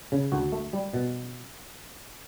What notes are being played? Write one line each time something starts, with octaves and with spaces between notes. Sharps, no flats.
C#3
D2 F#4
A3
G3
B2